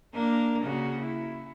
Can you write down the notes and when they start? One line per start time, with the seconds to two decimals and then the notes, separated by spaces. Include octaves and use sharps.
0.14 A#3 D4 A#4
0.62 C#3 A#3 F#4
1.02 E4